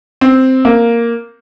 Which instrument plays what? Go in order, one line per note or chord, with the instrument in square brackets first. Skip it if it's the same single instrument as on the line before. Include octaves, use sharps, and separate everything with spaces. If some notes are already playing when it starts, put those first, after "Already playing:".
[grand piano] C4
A#3